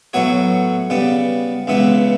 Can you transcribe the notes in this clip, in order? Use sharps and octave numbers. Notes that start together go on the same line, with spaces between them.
A2 F#3 B3 F#4 C#5
C#3 G3 B3
C#2 C#3 E3 B3